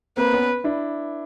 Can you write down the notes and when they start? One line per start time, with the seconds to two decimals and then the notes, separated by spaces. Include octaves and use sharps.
0.17 A#3 C4 B4
0.33 B3 C#4
0.64 D4 E4